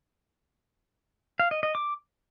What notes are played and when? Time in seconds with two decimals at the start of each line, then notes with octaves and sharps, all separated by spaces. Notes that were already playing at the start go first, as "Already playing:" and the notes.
1.40 F5
1.51 D#5
1.63 D#5
1.75 D6